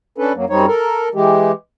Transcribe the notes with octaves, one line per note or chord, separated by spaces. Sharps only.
C#4 D4 A4 B4
F#2 F#3 A#3
F#2 G3 C4 D#4 C#5
A4 A#4
E3 G#3 G4